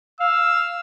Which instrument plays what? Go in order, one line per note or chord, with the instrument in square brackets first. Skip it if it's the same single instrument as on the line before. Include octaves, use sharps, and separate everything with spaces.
[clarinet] F5 [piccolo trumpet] E6